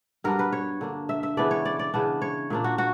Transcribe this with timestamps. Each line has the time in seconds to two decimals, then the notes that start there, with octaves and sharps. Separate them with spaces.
0.24 G2 F#3 B3 D4 A#4
0.39 B4
0.52 C#5
0.81 D3 A#3 D4
1.09 E5
1.23 E5
1.37 C#3 E3 B3 D4 D5
1.51 C#5
1.65 D5
1.79 D5
1.94 C#3 E3 B3 D4
2.22 C#5
2.50 A#2 A#3 D4
2.64 F#4
2.78 F#4